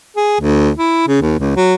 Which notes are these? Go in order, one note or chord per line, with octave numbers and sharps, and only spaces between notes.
G#4
D2
E4
C#3
D#2
C#2
F#3